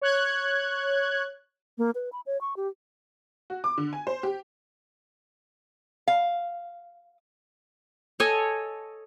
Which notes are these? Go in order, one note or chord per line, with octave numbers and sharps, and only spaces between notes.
C#5 F#6 G#6
A#3
B4
B5
C#5
C#6
G4
F#4
D6
D3
G#5
C5
G4
F5
A4 C#5 D#5 G#5